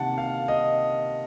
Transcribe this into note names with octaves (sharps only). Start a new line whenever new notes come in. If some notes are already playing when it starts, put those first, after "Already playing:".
Already playing: C3 D#3 A#3 F#5 A5
F5
D#5